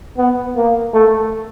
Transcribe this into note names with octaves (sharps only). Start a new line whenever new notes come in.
B3
A#3
A3